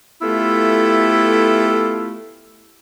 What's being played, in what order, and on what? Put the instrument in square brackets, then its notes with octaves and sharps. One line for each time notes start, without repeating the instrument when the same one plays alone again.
[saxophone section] A3 B3 E4 F4 G4 A4